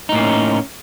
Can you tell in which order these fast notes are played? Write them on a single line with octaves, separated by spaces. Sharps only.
D#4 A2 A#3 C#4